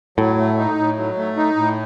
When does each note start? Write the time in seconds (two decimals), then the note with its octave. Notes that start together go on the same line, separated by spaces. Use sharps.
0.18 A2 F#3
0.38 A3
0.58 D#4
0.78 A2
0.97 F#3
1.17 A3
1.37 D#4
1.56 A2